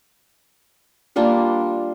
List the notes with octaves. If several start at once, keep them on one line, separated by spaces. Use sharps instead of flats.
G3 A#3 D4 F4